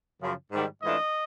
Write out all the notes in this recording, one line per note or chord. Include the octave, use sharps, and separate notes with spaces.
F#2 C#3 F3
G#2 D#3 G3
G#2 E3 A3 D4 F4 D#5